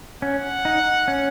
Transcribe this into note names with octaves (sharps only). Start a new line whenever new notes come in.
C#4 F#5
D#4
C#4